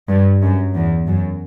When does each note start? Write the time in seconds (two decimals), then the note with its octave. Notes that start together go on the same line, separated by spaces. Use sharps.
0.09 G2
0.42 F#2
0.75 E2
1.07 F#2